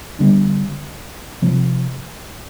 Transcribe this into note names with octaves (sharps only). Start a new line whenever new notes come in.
D3 G3 B3 D4
C3 F3 C4